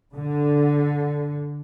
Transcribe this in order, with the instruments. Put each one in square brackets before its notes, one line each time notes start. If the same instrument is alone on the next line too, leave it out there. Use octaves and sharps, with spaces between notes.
[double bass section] D3